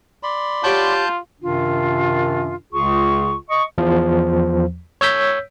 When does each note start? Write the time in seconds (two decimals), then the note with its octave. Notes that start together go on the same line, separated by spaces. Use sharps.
0.23 D5 B5 C6
0.64 F4 G4 C#5 F#5 A5 G6
1.42 F#2 C3 D#3 D4 F4
2.72 C#2 C#3 F4 G#4 C#6
3.50 D#5 C#6
3.78 E2 F3
5.01 C#5 E6 G6 B6